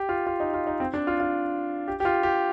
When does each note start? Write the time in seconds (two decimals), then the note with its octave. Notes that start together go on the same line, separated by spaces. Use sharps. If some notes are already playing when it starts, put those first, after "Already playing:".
Already playing: G4
0.09 F4
0.27 F4
0.40 D#4
0.54 F4
0.67 D#4
0.80 C4
0.94 D4
1.07 F4
1.20 F4
1.88 G4
2.00 G4
2.05 F4
2.23 G4